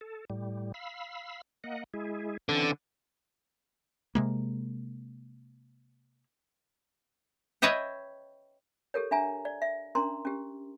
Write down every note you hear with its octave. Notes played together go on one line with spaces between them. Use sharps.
A4
A2 G3
F5 B5 E6
A#3 D#5 F#5
G#3 E4 G#4
D3 E3 C4 C#4
C3 G#3 A#3
B4 C#5 D#5 E5 G5
G4 A4 A#4 C#5
D4 E5 G#5 A#5
D5
E5
C#4 D4 A#4 A#5 C6
C#4 G4